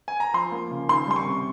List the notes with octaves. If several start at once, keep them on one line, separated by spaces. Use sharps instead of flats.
G#5
A#5
F3 C6
A#3
C#3
D#3 C6
G3 C6
C#6
C3